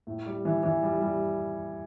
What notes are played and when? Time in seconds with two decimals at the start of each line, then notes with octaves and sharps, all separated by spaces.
0.07 A2
0.26 G3
0.45 E3
0.63 E3
0.83 G3
1.01 G3